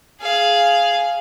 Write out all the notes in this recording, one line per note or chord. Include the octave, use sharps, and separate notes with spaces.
G#4 F5